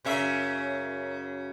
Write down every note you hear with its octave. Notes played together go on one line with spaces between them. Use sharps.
F#2 C#3 E5